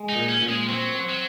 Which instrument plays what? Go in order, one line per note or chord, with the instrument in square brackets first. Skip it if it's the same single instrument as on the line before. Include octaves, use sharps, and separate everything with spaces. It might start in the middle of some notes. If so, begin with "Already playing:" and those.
Already playing: [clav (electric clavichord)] G#3
[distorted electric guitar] D#4
[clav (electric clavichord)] A#2
[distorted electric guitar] C#4
[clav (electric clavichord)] A#2
[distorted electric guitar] G#3
[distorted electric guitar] F#3 [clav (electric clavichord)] C4
[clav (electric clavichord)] C4
[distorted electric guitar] F#3